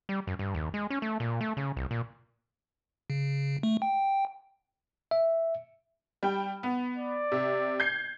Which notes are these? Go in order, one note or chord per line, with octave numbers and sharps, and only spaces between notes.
G3
F#2
G2
D#2
G#3
C#4
A3
A#2
A3
C#3
C2
A#2
C#3
A3
G5
E5
G3 G5
B3
D5
C3
G6 G#6 C7